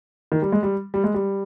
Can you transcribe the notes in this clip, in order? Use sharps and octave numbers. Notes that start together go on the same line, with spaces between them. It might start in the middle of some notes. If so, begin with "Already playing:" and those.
D#3
G3
G#3
G3
G3
G#3
G3